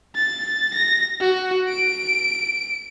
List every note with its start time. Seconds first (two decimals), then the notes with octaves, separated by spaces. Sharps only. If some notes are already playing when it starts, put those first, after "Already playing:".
0.15 A6
0.74 A#6
1.21 F#4
1.69 D7